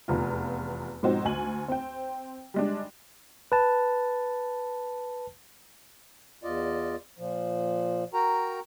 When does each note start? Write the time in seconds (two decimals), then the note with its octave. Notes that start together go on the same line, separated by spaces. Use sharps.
0.08 F1 E2 F4
1.03 G#2 B2 F3 C4 D#4 F#4
1.25 D2 G#5 F#7
1.68 C4 G5
2.54 G3 G#3 D4
3.52 B4 A5
6.43 E2 F4 D5 D#5
7.18 A#2 F3
8.14 F#4 A#4 G5 A#5